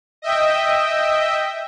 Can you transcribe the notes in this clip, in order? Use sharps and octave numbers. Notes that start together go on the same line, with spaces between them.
D#5 E5 G5